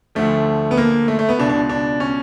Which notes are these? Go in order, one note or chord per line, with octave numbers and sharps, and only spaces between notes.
D2 D3 F3 A3
B3
A#3
A3
A3
B3
C#2 B2 D4
D4
D4
C#4